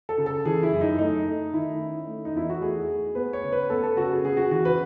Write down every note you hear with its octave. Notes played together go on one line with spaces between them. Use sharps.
A4
C#3
A4
E3 G#4
E4
F#2
D#4
A3 D#4
A3
D#3 E4
C#4
A3
D#4
E2 E4
F#4
A3 G#4
A3
B3 B4
C#5
C#3
B4
B3 A4
A4
C#3 F#4
G#4
C#3 G#4
F#4
E3 F#4
B4